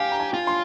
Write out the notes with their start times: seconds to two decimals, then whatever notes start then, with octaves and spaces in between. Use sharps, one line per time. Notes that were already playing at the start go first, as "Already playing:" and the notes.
Already playing: G4 F5 G5 G#5
0.12 A#5
0.20 G#5
0.34 F4
0.47 C6